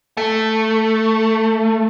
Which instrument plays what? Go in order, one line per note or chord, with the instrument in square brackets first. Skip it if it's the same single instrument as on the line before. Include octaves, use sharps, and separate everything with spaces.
[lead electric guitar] A3